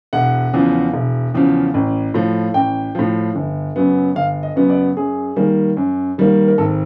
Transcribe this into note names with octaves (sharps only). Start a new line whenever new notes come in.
E1 F#5
E2 C#3 F3
E1
E2 C#3 F3
A1
A2 F3
A1 G5
A2 F3
G1
F#2 C#3 F#3 B3
G1 F5
D#5
F#2 C#3 F#3 B3
D5
F#2 G#4
D#3 G3 A#3
F#2
D#3 G3 A#3
A#4
G#1 A4